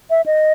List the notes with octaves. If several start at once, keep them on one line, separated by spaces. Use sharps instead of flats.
E5
D#5